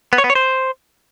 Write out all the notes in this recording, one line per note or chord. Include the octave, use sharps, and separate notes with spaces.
B3
C#5
B3
C#5
C5